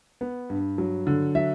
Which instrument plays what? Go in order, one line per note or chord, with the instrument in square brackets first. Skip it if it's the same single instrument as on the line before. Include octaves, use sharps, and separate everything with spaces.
[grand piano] B3
G2
F#3
D3
F#3 E5